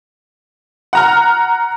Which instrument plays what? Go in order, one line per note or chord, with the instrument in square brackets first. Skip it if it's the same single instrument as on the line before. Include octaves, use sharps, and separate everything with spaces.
[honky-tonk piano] F#5 A#5 F6